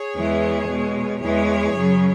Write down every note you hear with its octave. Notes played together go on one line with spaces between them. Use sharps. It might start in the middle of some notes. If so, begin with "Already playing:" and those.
Already playing: G#4 C#5
E2 E3 G#3
B2 G#3
E2 E3 G#3 G#4 C#5
F#2 C#3 F#3